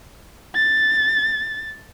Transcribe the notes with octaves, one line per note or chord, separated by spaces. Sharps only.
A6